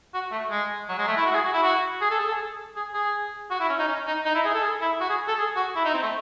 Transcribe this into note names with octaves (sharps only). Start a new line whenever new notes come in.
F#4
A3
G#3
F#3
G#3
A3
E4
F#4
G#4
F#4
E4
F#4
G#4
A4
G#4
A4
G#4
G#4
F#4
E4
C#4
D#4
C#4
D#4
D#4
E4
G#4
A4
G#4
E4
F#4
G#4
A4
G#4
F#4
E4
D#4
C4
A3